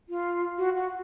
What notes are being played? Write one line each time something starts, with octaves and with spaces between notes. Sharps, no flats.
F4
F#4
F#4